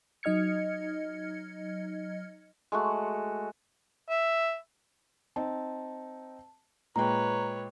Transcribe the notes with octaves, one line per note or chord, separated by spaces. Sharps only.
F#3 D#4 D#5 F6 G#6 C#7
G#3 A3 F#4
E5
C4 D#4 A5
A#2 G#3 B4 C#5 G5 A#5